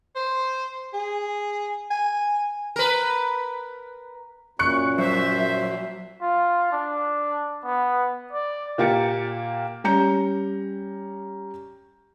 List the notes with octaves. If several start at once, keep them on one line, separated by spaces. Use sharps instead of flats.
C5
G#4
G#5
A#4 B4
F#2 A#2 C#6 F#6 C#7
F#3 C5 E5
F4
D4
B3
D5
A#2 A#3 G4 A6 C#7
G3 C#4 A#5 G6 C#7